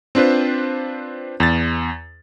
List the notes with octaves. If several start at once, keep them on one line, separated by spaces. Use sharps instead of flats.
C4 D4 F4 B4 C5
E2 A6